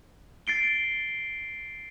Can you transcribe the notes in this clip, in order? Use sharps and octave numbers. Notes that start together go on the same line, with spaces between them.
A6 C7 D7 G7